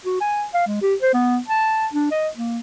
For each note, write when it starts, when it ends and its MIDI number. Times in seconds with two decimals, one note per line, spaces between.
0.06 0.19 66
0.21 0.45 80
0.54 0.67 77
0.67 0.81 56
0.82 0.95 67
1.02 1.13 72
1.14 1.39 59
1.48 1.87 81
1.94 2.09 62
2.11 2.29 75
2.37 2.59 58